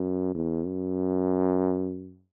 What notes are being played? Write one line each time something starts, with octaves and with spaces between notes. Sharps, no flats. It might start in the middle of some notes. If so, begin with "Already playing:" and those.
Already playing: F#2
E2
F#2